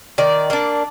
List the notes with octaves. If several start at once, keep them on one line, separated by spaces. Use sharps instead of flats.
D#3 D5
A#3 D4